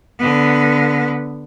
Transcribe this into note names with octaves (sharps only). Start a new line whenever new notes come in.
D3 B3